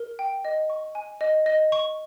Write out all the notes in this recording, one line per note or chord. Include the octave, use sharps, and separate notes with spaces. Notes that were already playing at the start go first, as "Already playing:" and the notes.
Already playing: A#4
G5
D#5
C#6
G#5
D#5
D#5
C#6